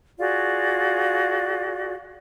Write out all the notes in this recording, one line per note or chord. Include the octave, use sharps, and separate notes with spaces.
F4 F#4 G#4 D5